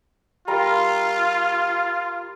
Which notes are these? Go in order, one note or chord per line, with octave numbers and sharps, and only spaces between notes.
G3 F4 A#4 A#5